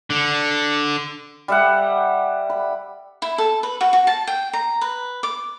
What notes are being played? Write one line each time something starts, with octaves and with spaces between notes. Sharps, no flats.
D3
G3 E5 F#5
B5
E4
A4
B4
F#4
F#4
A5
G5
A#5
B4
D6